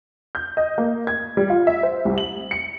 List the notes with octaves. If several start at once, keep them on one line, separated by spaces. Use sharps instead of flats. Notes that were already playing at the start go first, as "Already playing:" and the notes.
G6
D#5
A#3
G#6
G3
F4
E5
C5
C2
F#7
C#7